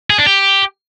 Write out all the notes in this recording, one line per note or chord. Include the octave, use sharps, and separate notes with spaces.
G#4
D4
G4